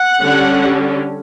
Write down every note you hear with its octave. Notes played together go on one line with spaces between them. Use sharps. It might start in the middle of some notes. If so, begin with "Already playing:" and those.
Already playing: F#5
D3 G3 C#4